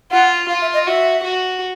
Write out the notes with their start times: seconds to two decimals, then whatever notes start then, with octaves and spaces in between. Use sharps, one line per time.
0.11 F4 F#5
0.49 F4 F5
0.61 E5
0.74 D#5
0.87 F#4 E5
1.24 F#4